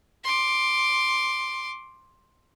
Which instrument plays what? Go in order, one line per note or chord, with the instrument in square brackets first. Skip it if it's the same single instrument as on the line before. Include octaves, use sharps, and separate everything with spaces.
[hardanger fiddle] C6 D6